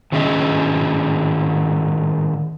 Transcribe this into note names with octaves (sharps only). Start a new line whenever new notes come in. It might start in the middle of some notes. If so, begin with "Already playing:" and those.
A2 D#3 C#4 G#4 D#5 E5